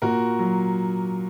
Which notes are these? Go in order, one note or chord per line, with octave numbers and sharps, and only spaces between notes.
A#2 F#4 A#4
F#3